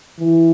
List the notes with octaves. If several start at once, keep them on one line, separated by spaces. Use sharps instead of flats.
E3